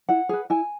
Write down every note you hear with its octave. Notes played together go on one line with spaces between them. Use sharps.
E4 F#5
G#4 B4
E4 G#5